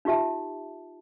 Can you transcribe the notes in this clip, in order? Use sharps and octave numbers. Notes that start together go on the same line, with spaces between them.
D#4 F4 G4 E5 A5